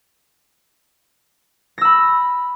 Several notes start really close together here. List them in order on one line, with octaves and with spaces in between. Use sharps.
A#6 E6 B5